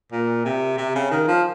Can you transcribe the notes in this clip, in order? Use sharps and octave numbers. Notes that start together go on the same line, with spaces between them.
A#2
C3
C3
C#3
D#3
F3